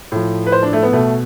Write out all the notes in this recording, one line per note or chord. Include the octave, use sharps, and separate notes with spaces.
A2 F3
B4
C5
D4
A3
B3
B2 A3